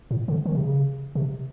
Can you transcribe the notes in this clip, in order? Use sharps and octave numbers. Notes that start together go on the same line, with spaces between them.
A2
D3
D#3
C3
C#3
C3